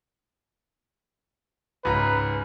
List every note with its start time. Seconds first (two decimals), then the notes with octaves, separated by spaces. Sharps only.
1.85 C#2 G#2 B4 A#5